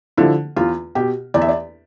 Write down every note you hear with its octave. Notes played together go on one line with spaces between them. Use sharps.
D3 F3 E4
E2 F4
B2 G4
E2 D5
E5
D5